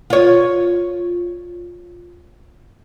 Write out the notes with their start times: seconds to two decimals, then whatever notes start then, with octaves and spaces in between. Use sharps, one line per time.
0.10 F4 C#5